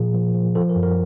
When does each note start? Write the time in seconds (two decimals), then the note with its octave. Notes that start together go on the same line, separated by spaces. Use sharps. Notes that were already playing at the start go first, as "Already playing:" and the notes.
Already playing: A#2 F3 G#4
0.14 F3
0.34 F3
0.55 F3 A4
0.69 A#4
0.76 F#2
0.83 A#4